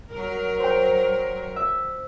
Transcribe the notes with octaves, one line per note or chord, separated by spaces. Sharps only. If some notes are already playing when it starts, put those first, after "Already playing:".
F#3 A#4
C5 G5
E5